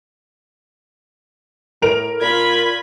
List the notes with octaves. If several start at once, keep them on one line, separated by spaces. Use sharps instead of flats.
A2 A#4 D7 F7
A#2 F4 B5 G#6